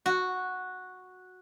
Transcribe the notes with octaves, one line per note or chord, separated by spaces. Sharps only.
F#4